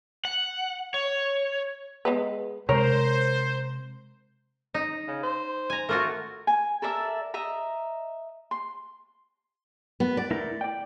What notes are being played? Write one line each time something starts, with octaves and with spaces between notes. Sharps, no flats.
F#5
C#5
G#3 B3 B4
C3 G#3 A#4 C5 C#5
D#4
C#3
C5
G#5 A#5
A3 F4 F#4 A#4
G#5
A4 A#4 D5 E5
D#5 E5 A#5
C6
B3
D5
A3 E4 A#4
D5 G5